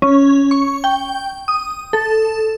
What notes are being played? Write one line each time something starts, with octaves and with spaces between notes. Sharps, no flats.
C#4
C#6
G5
D#6
A4